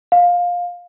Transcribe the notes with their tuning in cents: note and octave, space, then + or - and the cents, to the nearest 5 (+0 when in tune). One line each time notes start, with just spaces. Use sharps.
F5 +15